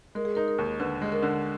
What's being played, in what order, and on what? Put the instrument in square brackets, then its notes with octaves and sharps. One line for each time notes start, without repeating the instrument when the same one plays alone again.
[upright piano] G#3 [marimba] A#4
[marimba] G#4
[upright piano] D#4 [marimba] A#4
[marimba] A#4
[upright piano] D#2
[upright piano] D3 [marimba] B4
[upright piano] G#3
[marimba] A#4
[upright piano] D3